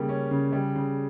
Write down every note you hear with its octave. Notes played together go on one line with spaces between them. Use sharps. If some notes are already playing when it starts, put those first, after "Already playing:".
Already playing: C#3 G3 A#3
C#4
C#3
G3
C#3